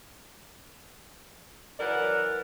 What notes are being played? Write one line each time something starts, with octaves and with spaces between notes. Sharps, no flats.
E3 F#3 A#4 D5 F#5